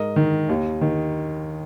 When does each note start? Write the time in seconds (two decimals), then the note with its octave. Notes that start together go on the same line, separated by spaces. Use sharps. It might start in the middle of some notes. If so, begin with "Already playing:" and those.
Already playing: G#2 A#4 D#5
0.16 D#3
0.49 D#2
0.81 D#3